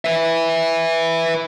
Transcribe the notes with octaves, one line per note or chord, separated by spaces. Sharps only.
B4 E5